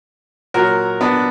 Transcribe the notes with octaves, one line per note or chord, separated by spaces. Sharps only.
A#2 F#3 F#4 A#4
B3 D4